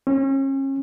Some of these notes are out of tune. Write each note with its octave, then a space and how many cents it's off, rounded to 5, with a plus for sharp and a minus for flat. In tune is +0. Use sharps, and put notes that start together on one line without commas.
C#4 -35